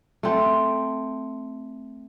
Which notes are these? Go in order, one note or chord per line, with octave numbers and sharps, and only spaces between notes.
A3 C4